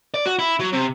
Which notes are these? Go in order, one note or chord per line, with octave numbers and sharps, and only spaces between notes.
D5
F#4
E4
F#3
C3